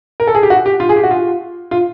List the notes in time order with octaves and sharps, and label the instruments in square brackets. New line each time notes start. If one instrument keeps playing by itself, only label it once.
[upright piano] A#4
A4
G#4
G4
F#4
G4
F4
G#4
G4
F#4
F4
F4